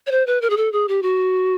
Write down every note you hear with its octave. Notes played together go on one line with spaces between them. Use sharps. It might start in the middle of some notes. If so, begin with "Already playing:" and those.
C#5
C5
B4
A#4
G#4
A4
G#4
G4
F#4